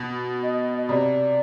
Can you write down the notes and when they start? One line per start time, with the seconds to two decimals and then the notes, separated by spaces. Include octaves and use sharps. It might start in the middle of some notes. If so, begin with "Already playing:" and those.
Already playing: B2
0.43 D#5
0.78 D#5
0.89 C3 D5